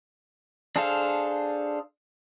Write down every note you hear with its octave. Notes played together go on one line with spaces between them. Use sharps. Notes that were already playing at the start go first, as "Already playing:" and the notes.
D4 G#4 A4 C5 F5